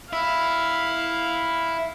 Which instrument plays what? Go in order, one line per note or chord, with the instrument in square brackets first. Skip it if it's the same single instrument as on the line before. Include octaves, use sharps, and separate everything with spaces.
[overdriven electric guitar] E4 [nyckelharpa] F5